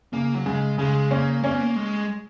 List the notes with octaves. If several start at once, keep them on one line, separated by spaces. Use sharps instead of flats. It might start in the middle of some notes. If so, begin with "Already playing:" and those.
C#3 A#3
F#3
C#3 G#3
C#3 G#3
A#3 C#4
A#3 C#4
B3
A#3
G#3